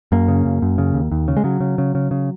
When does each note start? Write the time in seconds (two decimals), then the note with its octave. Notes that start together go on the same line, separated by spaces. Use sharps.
0.12 F#2 A#3
0.28 C#3
0.45 F#2
0.62 F#2
0.78 C#3
0.94 D#2
1.11 D#2
1.28 C#3
1.37 G#3
1.44 C#3 F#3
1.60 C#3
1.78 C#3
1.95 C#3
2.11 C#3